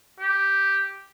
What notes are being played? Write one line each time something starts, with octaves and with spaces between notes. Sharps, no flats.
G4